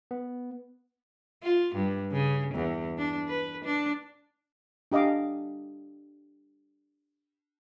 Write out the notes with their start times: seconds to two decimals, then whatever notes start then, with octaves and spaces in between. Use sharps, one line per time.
0.11 B3
1.43 F4
1.76 G2
2.12 C#3
2.55 E2
2.98 D4
3.28 B4
3.65 D4
4.92 D4 G4 D#5 F5 D6